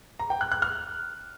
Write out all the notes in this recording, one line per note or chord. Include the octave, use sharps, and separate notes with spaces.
A#5
G5
F#6
F#6
F6